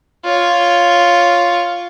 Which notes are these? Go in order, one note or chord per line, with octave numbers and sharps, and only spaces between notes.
F4 C#5